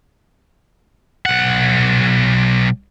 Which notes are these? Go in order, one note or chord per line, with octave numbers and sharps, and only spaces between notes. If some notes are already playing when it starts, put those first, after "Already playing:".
B1 F#5